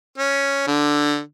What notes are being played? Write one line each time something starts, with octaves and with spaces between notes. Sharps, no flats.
C#4
D3